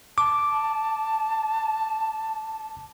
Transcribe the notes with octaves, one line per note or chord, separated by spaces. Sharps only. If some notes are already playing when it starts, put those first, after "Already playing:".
A5 D6